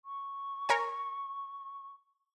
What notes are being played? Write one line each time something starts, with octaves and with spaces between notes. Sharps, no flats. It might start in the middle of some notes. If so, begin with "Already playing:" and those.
C#6
A#4 C#5 G#5